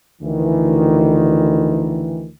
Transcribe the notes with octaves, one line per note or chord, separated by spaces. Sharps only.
D2 D#3 E3